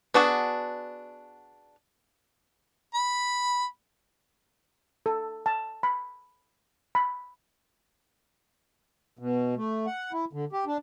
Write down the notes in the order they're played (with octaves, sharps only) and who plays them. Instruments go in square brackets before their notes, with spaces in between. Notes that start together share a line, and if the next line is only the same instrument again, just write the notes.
[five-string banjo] B3 D4 F#4 G#4
[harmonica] B5
[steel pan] A4
A5
B5
B5
[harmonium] B2
A3
F#5
E4
D3
G4
D4